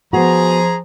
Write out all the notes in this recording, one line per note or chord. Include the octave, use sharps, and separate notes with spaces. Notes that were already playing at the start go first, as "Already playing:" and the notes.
F3 B3 F#4 G#4 A#5